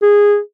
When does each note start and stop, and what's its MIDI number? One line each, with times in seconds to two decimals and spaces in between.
0.02 0.39 68